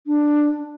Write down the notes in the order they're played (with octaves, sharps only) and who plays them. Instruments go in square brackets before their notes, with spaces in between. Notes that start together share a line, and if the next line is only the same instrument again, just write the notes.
[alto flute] D4